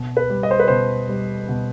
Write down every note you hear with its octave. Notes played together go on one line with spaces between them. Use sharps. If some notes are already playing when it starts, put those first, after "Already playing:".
Already playing: B2
B4
G3
D#5
C5
B4
B2 C5
G3
B2